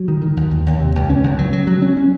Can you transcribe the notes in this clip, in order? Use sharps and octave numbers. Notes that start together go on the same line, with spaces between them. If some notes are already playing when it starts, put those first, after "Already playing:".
Already playing: F#3
D#3
D#3
D#2
D#2
D#2
C3
C#2
C#4
C#2
F#3
F#3
F#3
C#4
C#4